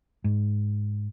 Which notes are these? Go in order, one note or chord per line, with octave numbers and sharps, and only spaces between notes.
G#2